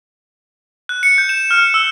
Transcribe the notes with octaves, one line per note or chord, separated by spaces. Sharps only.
F#6
C#7
G6
E7
F6
E6